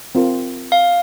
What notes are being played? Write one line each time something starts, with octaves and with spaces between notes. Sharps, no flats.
C4 F4 A#4
F5